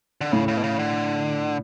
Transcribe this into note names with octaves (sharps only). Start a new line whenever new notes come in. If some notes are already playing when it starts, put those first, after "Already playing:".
D3
A2 C#3
C#3
B2
C#3
D3